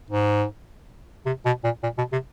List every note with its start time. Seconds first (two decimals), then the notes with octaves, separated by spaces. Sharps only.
0.10 G#2
1.26 C3
1.45 B2
1.64 A#2
1.83 A#2
1.98 B2
2.12 C3